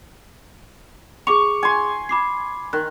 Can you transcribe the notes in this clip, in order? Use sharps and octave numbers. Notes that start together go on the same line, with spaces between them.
G#4 C#6 D6 F7
G#5 C6
B5 D6 C7
D#3 F#6